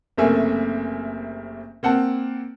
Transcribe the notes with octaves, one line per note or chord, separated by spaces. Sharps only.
F#1 C3 A3 A#3 E5 G#5
A#3 C4 F#5 A5